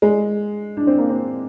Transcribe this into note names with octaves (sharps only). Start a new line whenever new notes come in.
G#3
D4
C4
A#3
C4